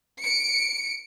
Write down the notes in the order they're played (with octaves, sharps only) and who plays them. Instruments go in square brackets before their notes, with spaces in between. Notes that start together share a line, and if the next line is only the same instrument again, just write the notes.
[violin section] C#7 D7